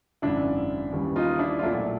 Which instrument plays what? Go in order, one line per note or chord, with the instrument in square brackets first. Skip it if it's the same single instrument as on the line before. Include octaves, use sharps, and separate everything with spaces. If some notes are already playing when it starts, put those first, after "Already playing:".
[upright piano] G#1 F#2 C#3 D4 E4
D#2 C#3 E3 G3
D#4 F4
D4 E4
F4
B1 A#2 F#3 A3 D4 E4